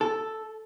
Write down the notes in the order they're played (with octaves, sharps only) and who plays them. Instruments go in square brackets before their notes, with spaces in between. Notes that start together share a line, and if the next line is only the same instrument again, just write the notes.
[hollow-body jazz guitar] A4